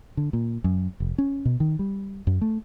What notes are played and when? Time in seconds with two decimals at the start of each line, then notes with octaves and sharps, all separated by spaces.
0.17 D3
0.33 A#2
0.64 F#2
1.00 F1
1.18 C#4
1.45 B2
1.60 D#3
1.79 G3
2.27 F#2
2.41 A3